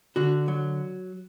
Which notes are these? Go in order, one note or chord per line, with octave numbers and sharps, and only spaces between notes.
D3 F#4
F#3